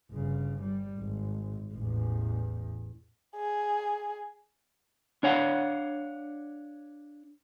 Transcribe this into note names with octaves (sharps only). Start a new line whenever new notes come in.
G1 C#3
G3
G#1
A1 E2
G#4
D4 C#5 F5 F#5